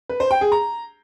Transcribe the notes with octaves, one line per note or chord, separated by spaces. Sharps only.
B4
C5
G5
G#4
A#5